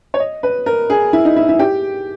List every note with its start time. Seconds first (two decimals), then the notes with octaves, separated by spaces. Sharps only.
0.14 C#5
0.20 D#5
0.43 B4
0.66 A#4
0.90 G#4
1.13 E4
1.25 D#4
1.36 E4
1.49 E4
1.59 G4